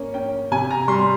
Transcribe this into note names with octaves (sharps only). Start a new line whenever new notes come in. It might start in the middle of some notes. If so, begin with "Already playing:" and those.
Already playing: A#3 C#4
C#4 G5
C3 G#5
A#5
G3 C6